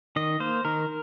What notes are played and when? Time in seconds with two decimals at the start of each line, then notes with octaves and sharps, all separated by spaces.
0.16 D#3 D#5
0.40 A#3 C5
0.65 D#3 A#4